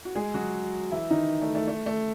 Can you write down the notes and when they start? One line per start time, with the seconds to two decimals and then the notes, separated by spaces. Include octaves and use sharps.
0.05 F#4
0.15 G#3 G#4
0.34 F#3 F#4
0.91 E3 E4
1.10 D#3 D#4
1.42 A3
1.55 A3
1.68 A3
1.86 A3